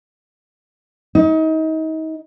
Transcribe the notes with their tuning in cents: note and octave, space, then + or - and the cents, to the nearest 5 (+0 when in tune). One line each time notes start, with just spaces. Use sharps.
D#4 +30